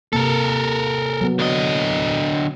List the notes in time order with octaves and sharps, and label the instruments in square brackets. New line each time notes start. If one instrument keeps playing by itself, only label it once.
[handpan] C3 A#3 [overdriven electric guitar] A4 A#4
[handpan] F#3 B3
[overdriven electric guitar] D3 D#5